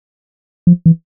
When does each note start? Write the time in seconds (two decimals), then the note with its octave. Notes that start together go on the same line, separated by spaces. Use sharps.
0.67 F3
0.86 E3